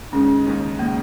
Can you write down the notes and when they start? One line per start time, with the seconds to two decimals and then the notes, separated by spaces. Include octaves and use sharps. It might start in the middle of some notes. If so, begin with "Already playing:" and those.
0.12 D#2 C#3 G#3 C#4 D#4
0.46 D#2 C#3 G#3 D#4
0.79 C#3 G#3 A#3 D#4